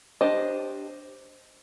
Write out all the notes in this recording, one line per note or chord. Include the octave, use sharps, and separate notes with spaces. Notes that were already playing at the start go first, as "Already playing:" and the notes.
D4 G4 C5 D#5